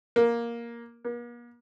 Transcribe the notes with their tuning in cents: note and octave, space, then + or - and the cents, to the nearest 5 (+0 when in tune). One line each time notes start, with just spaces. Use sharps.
A#3 +10
A#3 +45